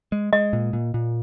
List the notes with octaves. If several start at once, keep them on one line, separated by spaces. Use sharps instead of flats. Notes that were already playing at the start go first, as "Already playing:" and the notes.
G#3
G#3 D#5
A#2
A#2
A#2